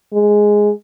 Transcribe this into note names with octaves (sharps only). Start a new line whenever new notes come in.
G#3